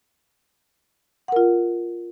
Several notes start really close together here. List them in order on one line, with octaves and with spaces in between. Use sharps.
F#5 A#4 F4